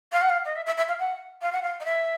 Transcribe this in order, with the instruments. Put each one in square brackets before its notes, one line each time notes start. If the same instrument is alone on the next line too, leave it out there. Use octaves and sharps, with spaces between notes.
[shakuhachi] F5
F#5
F5
D#5
E5
E5
E5
F5
F#5
F5
F#5
F5
D#5
E5